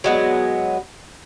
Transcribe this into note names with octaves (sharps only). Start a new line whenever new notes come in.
F#3 G#3 B3